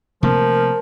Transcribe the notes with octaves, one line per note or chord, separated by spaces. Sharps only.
C3 F3 A3 A#3 A#4